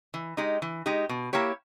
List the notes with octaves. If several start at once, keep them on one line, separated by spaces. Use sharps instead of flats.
E3
G#3 D#4 G4
E3
G#3 D#4 G4
B2
A#3 E4 G4 C#5